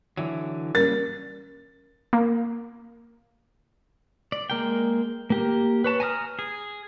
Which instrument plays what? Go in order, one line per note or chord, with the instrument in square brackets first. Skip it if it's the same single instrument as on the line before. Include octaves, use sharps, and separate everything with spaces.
[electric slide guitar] D3 E3 F#3
[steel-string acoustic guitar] C#3 G3 A#3 [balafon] A#4 [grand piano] A6
[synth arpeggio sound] A#3
[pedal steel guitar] D5
G#3 A#3 A#4 G5
A#3 G4 A#4
B4 C#5 A5
G#5 A#5 D#6 F6
G#4